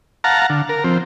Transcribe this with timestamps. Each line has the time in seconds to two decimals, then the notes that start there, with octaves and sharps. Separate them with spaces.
0.24 F5 F#5 A5 A#5
0.50 D3
0.69 A#4
0.84 F3 C4